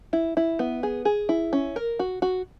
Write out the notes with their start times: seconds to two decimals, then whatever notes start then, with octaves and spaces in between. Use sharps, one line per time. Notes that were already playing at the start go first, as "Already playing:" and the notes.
0.13 E4
0.37 E4
0.59 B3
0.83 G#4
1.05 G#4
1.29 E4
1.53 C#4
1.76 A#4
1.99 F#4
2.22 F#4